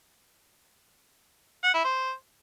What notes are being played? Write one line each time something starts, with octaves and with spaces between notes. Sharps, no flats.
F#5
E4
C5